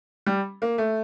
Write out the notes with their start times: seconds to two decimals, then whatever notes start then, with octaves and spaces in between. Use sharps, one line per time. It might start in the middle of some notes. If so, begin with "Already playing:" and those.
0.26 G3
0.62 A#3
0.78 A3